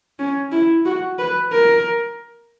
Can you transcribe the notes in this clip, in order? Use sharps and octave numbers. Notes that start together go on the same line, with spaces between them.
C#4
E4
F#4
B4
A#4